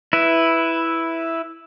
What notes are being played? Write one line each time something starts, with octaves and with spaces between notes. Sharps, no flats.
E4 B4